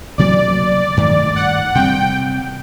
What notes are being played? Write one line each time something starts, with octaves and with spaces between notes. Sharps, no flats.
D2 C3 F#3 A#3 D5
G2 D#3 A3
F#5
C3 G3 C4 G5